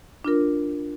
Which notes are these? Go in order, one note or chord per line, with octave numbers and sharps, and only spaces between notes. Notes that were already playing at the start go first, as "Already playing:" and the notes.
D4 F4 A#4